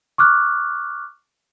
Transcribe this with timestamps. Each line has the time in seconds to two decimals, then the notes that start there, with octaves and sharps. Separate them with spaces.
0.18 C#6 D6 F6 F#6